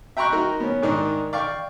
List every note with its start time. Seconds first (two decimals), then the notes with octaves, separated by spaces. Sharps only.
0.17 E5 G5 A#5 C6 C#6 F#6
0.32 D#4 F#4 A#4
0.60 B3 C#4
0.82 G#2 D#3 D4 D#4
1.33 D5 F5 G5 C#6